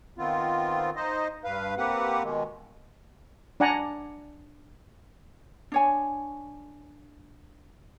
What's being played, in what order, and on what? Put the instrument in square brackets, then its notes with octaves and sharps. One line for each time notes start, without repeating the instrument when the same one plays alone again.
[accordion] D#3 B3 C4 F4
D#4 C5 D#5
G2 B4 F5
A#3 C4 G4 B4 F#5
B2 D#3 G#3
[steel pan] D4 D5 F#5 G#5 A#5
[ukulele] D4 C#5 G#5